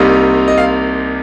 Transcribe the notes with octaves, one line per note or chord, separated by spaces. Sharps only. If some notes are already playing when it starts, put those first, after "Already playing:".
Already playing: C2 C3 G3 A#3 D#4
D#5
F5